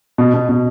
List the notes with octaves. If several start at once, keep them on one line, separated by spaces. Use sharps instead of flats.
B2
B2
B2